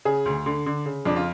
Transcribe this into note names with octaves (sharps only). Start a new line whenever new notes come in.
C#3 G#4
D2
D3
D3
C#3
F2 D4
F4